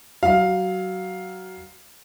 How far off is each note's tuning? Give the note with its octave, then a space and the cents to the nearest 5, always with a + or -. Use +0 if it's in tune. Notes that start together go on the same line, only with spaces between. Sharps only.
F#3 +20 F5 +5